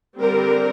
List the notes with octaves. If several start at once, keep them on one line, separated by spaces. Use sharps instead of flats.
D3 G3 C4 A#4